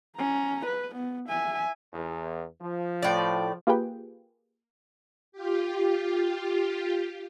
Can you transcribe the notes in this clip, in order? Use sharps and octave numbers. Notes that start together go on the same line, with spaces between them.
C#4 A#5
B4
B3
E5 G#5
E2
F3
A2 D5
A#3 F4 G4 G#4 B4 G5
F4 G4